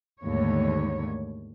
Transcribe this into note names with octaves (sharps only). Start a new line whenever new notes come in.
D#2 G#2 D3 A3 C#5